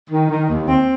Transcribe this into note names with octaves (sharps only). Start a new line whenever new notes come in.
D#3
D#3
D#2
C4